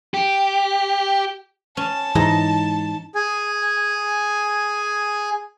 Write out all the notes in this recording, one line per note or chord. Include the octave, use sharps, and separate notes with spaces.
G4
C#4 A5
G#2 E3 G#3 D#4
G#4 G#5